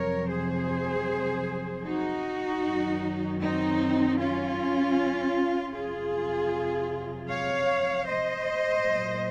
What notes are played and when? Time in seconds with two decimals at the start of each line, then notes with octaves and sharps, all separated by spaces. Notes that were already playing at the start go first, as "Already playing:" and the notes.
Already playing: F2 C3 F#3 A#4 C#5
0.31 G#4 C5
1.86 D#4 F#4
2.63 F#2 D#3 F#3
3.41 C4 D#4
4.18 C#4 F4
5.74 F2 C3 F#3 F4 G#4
7.29 C#5 F5
8.07 C5 D#5
8.84 A#2 F#3